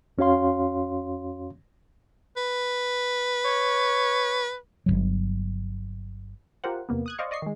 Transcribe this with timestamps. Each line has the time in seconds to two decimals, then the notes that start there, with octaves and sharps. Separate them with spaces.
0.18 F2 C#4 F#4 C#5 F5 C6
2.37 B4
3.45 C#5
4.86 G1 D#2 F#3
6.64 F4 G4 A#4 C5 F#5
6.89 E2 C3 A#3 B3
7.06 D#6 F#6 G#6
7.18 C5 D5 D#5 F5 C#6
7.31 D5 D#5 C#6 C7
7.42 D#3 G#3